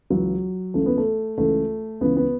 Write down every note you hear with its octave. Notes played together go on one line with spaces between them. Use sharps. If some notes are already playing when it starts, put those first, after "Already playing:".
C#2 C#3 E3 F#3
C#2 C#3 E3 A3
B3
A3
C#2 C#3 E3 A3
C#2 C#3 E3 B3
B3